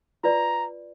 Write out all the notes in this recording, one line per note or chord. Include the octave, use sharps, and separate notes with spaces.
F4 B4 D5 A#5